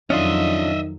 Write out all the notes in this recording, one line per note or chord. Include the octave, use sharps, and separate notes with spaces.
F2 D#3 F#3 C#4 D4 F4 D#5 E5